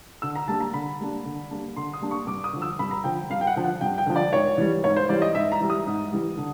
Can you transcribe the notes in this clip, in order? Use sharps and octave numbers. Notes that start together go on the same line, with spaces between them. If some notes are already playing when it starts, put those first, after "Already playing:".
D3 E6
A#5
G3 A#3 D4 A5
A#5
D3 B5
G3 A#3 D4
D3
G3 A#3 D4
D3 C6
D#6
G3 A#3 D4
C#6
G2 D6
D#6
D3 F3
E6
G2 B5
A#5
D3 F3 G5
G2 F5
G5
F#5
D3 F3
F#5
G2 G5
G5
D3 F3
D5
G#2 C#5
E3 G3
G#2 C#5
C5
E3 G3 D5
D#5
G#2 E5
A#5
E3 G3
D#6
G#2
E3 G3
D3